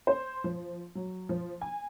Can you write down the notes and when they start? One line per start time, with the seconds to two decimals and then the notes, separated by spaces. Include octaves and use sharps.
0.07 C5
0.44 F3
0.95 F#3
1.29 F3
1.61 G#5